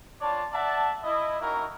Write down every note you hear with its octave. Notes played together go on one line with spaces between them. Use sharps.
D4 F4 C#5 D5 A5
D5 E5 F#5 A5
E4 D#5
A#3 C#4 D#4 E4 F#4 A#4